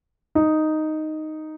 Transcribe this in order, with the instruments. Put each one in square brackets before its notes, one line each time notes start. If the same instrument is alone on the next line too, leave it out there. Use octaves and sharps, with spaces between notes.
[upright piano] D#4